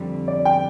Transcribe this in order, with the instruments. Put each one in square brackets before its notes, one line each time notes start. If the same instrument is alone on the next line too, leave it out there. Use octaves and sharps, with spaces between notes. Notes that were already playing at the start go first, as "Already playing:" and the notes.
Already playing: [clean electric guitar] F2 D3 G3 C4
[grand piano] D5
G5